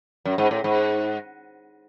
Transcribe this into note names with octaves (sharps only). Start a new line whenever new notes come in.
F#2
G#2
A2
G#2